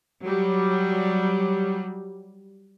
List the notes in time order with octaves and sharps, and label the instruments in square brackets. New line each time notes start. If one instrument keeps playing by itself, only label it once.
[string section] F#3 G3